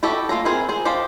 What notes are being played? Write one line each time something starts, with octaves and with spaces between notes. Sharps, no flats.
E4 F#4 G4 A4 D#5
A#3 F4 A4 A#5
C4 E4 G#4 A#4 C5
G#4 C5
G4 A4 C5 D#5 F5